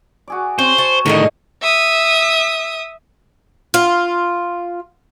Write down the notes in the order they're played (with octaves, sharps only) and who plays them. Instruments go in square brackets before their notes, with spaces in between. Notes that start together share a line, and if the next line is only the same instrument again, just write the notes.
[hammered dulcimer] F#4 G#4 D5
[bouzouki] C4 [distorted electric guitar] C5 [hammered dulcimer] C#5
[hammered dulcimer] C#5 C#6 [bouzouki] A5
[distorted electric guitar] A2 D#3 [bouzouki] D3 G#4 D#5
[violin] E5 D#6
[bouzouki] F4